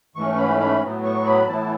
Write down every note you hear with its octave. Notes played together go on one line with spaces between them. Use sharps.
G#2 E3 A3 C#4 C#6
B5
B5
A2 F#3 B3
C#6
B5
A2 E3 B3 E4 A5